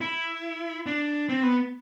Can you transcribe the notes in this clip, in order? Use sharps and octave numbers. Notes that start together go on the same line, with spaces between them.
E4
D4
C4
B3